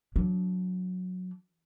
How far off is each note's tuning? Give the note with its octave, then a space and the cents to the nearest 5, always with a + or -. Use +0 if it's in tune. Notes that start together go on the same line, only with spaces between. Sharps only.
F#3 -15 D4 -15